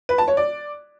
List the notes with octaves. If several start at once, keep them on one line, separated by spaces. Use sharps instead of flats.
B4
A5
C#5
D5